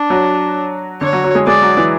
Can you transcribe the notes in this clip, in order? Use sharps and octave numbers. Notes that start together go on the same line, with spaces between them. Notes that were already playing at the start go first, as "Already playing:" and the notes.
Already playing: D4
F#3 F#4
D3 D4 C#5
F#3 F#4
F#3 F#4
G#3 G#4
G#3 G#4 D5
F#3 F#4
E3 E4